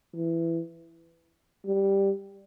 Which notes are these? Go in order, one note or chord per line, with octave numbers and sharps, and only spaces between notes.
E3
G3